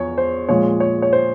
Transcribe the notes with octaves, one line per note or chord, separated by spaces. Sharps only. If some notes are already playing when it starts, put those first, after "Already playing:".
Already playing: E2 F3 C#5
C5
A#2 F3 G#3 C#5
C#5
C#5
C5